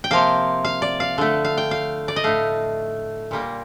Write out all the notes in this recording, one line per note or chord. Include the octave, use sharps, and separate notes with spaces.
G5
C3 F3 A#3 F5
F5
D5
F5
D3 A3
F5
G5
F5
D5
D#5
A2 A3 F5
A#2 G3 A#3